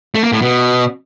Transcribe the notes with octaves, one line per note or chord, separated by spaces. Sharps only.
A3
A#3
A2
B2